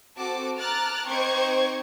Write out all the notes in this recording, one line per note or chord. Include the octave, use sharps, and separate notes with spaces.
C4 F#4 A4 A5 D6
A5 A#5 D6 F6 F#6 A6
C4 D#4 C5 C#6 D6 G#6